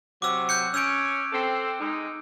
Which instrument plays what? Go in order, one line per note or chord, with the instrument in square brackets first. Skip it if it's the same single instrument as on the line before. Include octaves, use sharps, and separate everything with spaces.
[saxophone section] C3 F#3 [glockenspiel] D6 E6
[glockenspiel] F#6 G6 C#7
[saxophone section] C#4 [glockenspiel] E6 G6 D7
[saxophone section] C4 A4
G#3 D#4